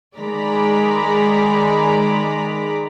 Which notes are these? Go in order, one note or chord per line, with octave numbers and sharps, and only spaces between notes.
D#3 G#3 D5 A#5 B5